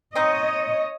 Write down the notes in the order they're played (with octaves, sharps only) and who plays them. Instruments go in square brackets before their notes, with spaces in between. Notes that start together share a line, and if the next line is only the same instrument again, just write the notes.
[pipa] C4 D#4 [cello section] C#5 D#5